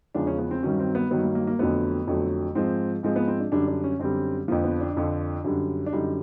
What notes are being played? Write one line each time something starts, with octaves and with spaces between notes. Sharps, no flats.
E2 C#3 F3 G#3 D4
C#4
B3
C4
G2 D#3 F#3 C#4
C4
B3
G2 D#3 F#3 B3
A#3
A#3
A#3
F2 D3 F#3 A3 B3
F2 D3 F#3 A3
G#2 F3 G#3 C4
G#2 F3 G#3 C4
B3
C4
D4
F#2 D3 G3 D4
D4
C#4
F#2 D3 G3 C4
F2 D3 F3 A#3
B3
D4
F2 D3 F3
F#2 D3 G3
D4
F#2 D3 G3 D#4